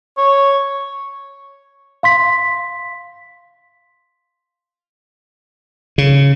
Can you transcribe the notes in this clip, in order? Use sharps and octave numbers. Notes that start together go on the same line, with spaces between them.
C#5
F5 C6 B6
C#3